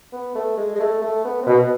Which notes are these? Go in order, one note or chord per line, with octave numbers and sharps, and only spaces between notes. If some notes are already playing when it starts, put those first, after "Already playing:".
B3
A3
G#3
G#3
A3
A3
B3
C4
B2 B3